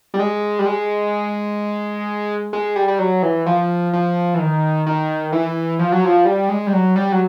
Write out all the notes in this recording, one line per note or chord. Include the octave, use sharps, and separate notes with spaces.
G3
G#3
G3
G#3
G#3
G3
G3
F#3
E3
F3
F3
E3
D#3
D#3
E3
F3
F#3
F3
G3
G#3
G3
F#3
G3
F#3